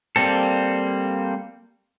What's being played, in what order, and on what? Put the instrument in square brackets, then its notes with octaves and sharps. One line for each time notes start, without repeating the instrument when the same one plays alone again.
[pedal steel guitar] G3 A#3 C4 A4